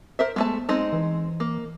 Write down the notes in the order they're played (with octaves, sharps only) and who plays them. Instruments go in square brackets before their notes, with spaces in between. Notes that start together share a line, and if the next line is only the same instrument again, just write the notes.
[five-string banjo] A#4 C5 E5
[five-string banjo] G#3 A3 A5 [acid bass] B3
[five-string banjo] G#3 C4 D#4
[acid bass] E3
[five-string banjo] A#3